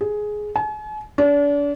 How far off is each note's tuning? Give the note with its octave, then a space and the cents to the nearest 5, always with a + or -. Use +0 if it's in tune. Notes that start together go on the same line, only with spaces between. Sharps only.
G#4 +10
G#5 +45
D4 -35